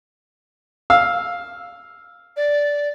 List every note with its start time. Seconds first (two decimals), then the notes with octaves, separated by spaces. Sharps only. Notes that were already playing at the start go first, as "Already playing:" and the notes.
0.90 F5 E6
2.37 D5